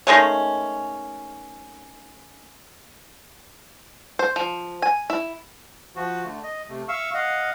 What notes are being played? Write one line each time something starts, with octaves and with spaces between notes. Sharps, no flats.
D#3 G#3 A3 C#4
C5
F3
G#5
E4
F3 F#4
D3 A3
D#5
C3 A3
E5 F5 C#6 E6
D#5 F5 F#5